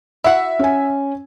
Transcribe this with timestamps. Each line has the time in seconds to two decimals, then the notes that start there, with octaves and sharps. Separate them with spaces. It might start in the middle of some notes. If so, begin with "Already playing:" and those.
0.24 E4 F#4 E5 F#5
0.59 C#4 G#5